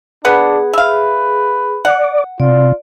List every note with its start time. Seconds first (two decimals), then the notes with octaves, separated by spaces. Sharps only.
0.25 B3 D4 G#4 B4 F#5
0.73 B4 E5 F5
1.85 D5 F#5
2.40 C3 F4 D5